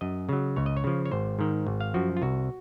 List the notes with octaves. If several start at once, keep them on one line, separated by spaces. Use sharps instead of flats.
F#2 D#5
C#3 F#3
C#2 C#5
D#5
C#5
C#3 F3
C#5
G#1 C5
G#2 D#3
G#1
F5
F#2 F3 F#4
F4
C2 F#4